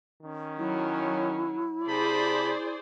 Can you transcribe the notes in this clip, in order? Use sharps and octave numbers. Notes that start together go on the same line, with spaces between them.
D#3 C#4
F#3 E4
C3 G#4 C5 D5 A5 B5